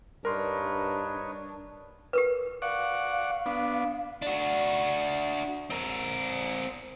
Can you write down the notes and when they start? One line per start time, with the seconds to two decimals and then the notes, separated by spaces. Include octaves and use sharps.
0.25 G2 D4 D#4 A#4 B4 C#5 C6
2.13 G4 A#4 B4
2.62 D5 F5 F#5 C#6
3.46 B3 D4
4.22 D4 F#4
5.70 C4 A#4